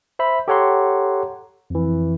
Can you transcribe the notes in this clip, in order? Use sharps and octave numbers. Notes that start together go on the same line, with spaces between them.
C5 E5 B5
G4 A4 C#5 F#5 A#5 C6
F2 E3